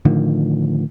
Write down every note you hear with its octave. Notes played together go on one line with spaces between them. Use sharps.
A2 D3 D#3 F3